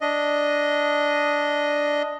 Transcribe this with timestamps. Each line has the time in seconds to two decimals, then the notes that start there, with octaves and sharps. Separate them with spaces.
0.01 D4 D#5